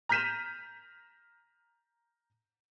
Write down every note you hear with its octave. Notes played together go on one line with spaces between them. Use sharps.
A#5 F6 G6 B6 D#7 E7